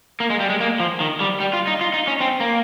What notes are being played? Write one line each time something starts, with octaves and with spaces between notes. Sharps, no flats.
A#3
G#3
G3
G#3
A#3
F3
D#3
G3
G3
F4
D#4
F4
D#4
C#4
C4
A#3